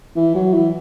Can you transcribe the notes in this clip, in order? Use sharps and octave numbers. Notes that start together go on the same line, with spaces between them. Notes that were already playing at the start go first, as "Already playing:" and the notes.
E3
F#3
E3